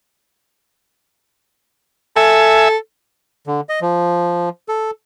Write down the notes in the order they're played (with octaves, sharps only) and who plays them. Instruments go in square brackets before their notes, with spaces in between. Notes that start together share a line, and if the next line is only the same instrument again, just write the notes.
[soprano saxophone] A4 [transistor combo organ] E5 G#5
[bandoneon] D3
D#5
F3
A4